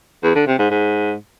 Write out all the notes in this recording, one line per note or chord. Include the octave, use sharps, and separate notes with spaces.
E2
D3
C3
G#2
G#2